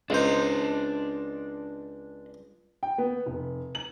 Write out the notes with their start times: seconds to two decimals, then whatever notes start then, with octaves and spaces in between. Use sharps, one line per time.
0.10 C#2 D4 C5 D#5
2.83 G5
2.98 B3
3.26 F1
3.75 F#7